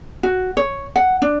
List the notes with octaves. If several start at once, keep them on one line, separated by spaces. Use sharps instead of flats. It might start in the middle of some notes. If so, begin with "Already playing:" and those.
F#4
C#5
F#5
D4